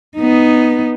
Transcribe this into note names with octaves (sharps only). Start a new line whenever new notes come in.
B3 D#4